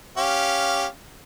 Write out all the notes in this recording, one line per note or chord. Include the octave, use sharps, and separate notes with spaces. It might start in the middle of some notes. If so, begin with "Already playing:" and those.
C#4 G4 F5